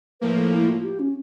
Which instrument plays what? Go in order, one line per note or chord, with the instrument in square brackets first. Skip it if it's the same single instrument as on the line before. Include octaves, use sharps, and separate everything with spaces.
[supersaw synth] A2 F3 A#3 [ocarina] B4
[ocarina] A4
E4
F4
G4
C#4